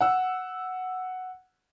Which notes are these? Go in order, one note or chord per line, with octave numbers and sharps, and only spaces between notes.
F#5 E6